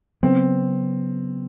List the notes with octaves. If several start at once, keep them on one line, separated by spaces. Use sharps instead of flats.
C#3 F#3 B3 C4